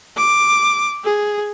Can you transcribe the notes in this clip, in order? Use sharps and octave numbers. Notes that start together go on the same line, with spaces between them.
D6
G#4